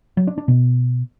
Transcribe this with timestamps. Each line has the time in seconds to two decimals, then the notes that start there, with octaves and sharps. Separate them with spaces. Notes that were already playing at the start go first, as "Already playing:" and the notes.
0.17 F#3
0.27 D4
0.38 D4
0.48 B2